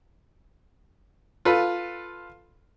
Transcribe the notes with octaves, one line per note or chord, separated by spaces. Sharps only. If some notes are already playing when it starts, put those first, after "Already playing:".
F4 A4 B4